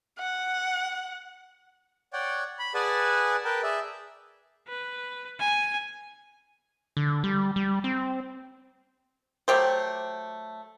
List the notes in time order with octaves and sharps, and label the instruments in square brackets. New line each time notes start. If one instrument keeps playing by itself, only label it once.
[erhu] F#5
[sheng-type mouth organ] C#5 D5 F#5 G5
B5
G#4 B4 D5 F#5 G#5 A5
A#4 B4 G5 A5
G#4 D5 E5
[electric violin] B4
G#5
[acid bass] D3
G3
G3
C4
[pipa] F#3 A3 G4 C5